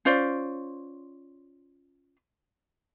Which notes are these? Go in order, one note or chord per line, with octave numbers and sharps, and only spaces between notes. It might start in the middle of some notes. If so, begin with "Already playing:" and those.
C#4 F4 C5 D5